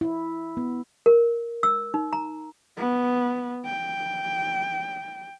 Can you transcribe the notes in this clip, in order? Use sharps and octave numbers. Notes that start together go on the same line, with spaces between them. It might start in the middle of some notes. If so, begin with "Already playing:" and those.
E4
B3
A#4
E6
D#4
A#5
B3
G5